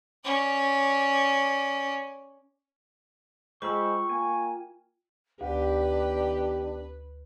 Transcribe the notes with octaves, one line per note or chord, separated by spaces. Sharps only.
C#4 D5
G#3 F4 C5 G5 B5 C#6 E6
A#3 G#5
D2 D#3 B3 D4 G4 B4